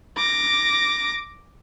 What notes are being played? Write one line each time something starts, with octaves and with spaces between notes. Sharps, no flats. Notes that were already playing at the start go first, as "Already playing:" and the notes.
D6 A#6